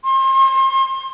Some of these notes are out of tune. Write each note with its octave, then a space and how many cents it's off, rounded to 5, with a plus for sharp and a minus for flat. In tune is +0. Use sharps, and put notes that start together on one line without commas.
C6 +35